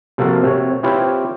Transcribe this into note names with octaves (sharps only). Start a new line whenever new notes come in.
C3 F3 A#3 F4 F#4 A4
C3 C#5
C4 E4 F4 G4 B4 C#5